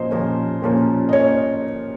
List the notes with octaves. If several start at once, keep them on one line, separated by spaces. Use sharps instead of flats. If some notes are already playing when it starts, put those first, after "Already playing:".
Already playing: A#2 F3 A#3 C#4 C5 D#5
A#2 F3 A#3 C#4
A#2 F3 A#3 C#4
D#5
A#3 C#4 C#5